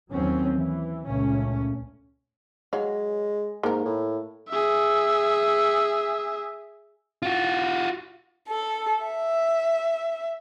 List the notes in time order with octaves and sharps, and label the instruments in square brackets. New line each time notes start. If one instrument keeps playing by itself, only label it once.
[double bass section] D#2 F#3 C4 C#4
E3
C#2 A#2 A3 C#4
[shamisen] F#3 C#5 F5 [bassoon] G#3
[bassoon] G#2 [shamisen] A#3 A#4
[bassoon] A2
[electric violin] G#4 E5
[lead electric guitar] F4 F#4
[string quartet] A4
E5